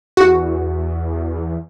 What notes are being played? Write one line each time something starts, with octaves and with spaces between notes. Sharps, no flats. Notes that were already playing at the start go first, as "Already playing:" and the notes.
E2 F#4